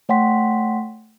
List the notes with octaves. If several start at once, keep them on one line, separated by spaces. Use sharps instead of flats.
A3 C#5 F#5 G5 C6 B6